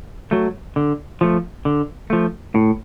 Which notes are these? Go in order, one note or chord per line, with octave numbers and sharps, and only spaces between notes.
F#3 A3
D3
F3 A3
D3
F3 A3
A2